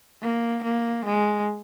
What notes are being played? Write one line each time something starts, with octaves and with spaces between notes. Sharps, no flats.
A#3
A#3
G#3